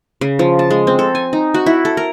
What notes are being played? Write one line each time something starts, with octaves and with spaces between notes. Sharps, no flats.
C#3
F3
A5
G#3
C4
A4
G#5
D#4
F#4
E4
A4
A#4